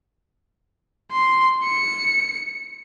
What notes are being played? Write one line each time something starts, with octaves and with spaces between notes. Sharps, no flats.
C6
C#7